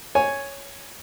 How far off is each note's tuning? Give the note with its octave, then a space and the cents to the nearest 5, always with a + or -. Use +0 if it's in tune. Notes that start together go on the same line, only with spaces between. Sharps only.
C#5 +0 G#5 +0